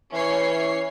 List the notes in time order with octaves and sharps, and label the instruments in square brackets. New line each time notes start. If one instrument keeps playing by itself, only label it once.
[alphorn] E3 [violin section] C#4 C#5 C7